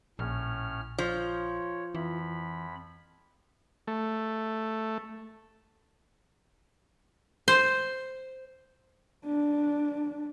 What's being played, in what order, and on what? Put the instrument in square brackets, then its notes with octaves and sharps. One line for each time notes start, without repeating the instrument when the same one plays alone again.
[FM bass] A#1 [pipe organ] A2 C#4 F6
[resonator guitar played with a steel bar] F3 [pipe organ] C#5
[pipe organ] F2 B5 [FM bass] E3
[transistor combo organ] A3
[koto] C5
[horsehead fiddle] D4